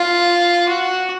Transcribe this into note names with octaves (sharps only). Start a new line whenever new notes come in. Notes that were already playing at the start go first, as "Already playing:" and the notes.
Already playing: F4
F#4